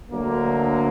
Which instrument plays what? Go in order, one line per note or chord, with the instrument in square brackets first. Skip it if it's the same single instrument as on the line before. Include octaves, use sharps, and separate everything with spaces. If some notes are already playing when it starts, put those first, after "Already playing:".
[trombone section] D2 D3 F#3 A#3